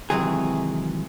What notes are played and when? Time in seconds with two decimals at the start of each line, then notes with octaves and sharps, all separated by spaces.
0.10 C3 D#3 E3 F#3 G#3 G#4